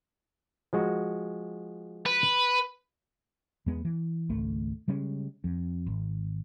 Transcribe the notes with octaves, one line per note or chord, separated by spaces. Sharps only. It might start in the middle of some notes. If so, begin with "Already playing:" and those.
F3 G#3 F#4
B4
E2 G#3 B3
E3
G#1 C#2 A3
C#3 G3 G#3 C#4
F2
G#1